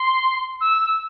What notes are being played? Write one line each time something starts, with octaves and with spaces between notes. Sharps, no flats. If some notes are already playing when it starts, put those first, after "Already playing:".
Already playing: C6
E6